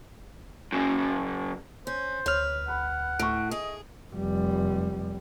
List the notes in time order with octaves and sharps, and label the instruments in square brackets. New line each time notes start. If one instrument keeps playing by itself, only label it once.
[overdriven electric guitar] F#2 C#3
[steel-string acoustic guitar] C#4 [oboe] C5
[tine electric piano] D2 F6 [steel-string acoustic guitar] B4 [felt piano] C#5
[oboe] F#5 [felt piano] B5
[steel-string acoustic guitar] A2 [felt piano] C#6 D7
[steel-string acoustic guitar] G#4 [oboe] D#5
[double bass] F1 G3